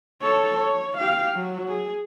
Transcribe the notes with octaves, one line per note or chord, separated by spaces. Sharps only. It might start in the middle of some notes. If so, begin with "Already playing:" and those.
A4 C#5
C#5
G4 F5
F#3
G#4